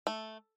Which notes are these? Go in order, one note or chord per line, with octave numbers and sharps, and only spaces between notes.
A3